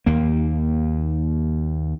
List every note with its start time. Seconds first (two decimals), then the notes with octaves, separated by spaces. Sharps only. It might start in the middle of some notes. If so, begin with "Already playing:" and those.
0.06 D#2 A#3